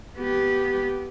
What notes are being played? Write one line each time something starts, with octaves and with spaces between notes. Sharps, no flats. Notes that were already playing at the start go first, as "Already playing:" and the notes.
B3 G4